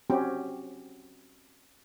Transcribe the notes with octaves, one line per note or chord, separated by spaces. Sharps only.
C4 C#4 F#4 G4 G5